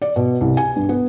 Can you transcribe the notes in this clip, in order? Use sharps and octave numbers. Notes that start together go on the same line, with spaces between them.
D5
B2
C2
G#5
G2
B3